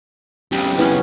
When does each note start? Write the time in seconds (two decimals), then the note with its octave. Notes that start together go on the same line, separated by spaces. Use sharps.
0.52 B1 C#3 G4
0.78 E3 B3 C#4